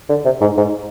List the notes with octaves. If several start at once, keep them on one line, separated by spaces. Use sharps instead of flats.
D3
C3
G#2
G#2